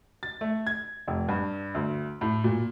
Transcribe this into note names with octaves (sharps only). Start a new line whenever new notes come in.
A6
A3
G#6
F1
G2
D2
A2
A#2